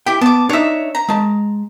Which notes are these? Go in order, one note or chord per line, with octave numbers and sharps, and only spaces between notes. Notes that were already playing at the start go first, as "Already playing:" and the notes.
E4 G4 G5
B3 A5 D6
D4 D#4 C#5 E5
A#5
G#3 A5